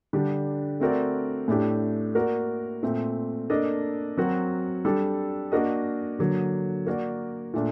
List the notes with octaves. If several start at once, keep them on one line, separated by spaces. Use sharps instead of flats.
D3 G3 D4 G4
A3 C4 F#4 A#4 D5
A2 A3 D4 G4
A#3 F#4 A#4 D5
A#2 A3 C4
A#3 D4 A4 D#5
F#3 C4 F#4 A#4
G3 D4 A4
A#3 D4 F#4 A#4 D#5
D3 F#3 A#3
A#3 F#4 A#4 D5
A#2 A3 D4